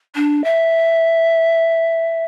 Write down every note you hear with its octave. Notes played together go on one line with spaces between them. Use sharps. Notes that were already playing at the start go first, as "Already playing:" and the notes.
D4
E5